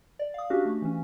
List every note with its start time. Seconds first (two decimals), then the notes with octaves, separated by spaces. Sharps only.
0.19 D5
0.34 F5 D#6
0.50 C#4 D4 F#4 G4 F5
0.65 A3
0.82 E3 C#4